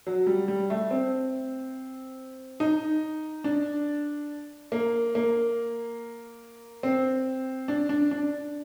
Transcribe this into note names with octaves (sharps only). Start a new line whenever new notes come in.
F#3
G3
G3
A3
C4
D#4
D4
A#3
A#3
C4
D4
D4
D4